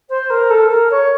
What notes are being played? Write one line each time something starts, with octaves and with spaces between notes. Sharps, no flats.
C5
A#4
A4
A#4
C#5